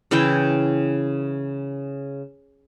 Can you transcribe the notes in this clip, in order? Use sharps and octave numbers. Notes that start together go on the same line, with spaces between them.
C#3 E3 E4 G5